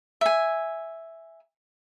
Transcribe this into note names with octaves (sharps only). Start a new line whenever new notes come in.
E5 G#5